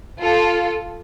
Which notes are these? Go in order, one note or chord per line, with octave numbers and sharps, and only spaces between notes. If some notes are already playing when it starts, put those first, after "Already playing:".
F4 A4